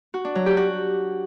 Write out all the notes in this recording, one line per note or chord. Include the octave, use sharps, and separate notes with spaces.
F#4
D4
F#3
G4
F#4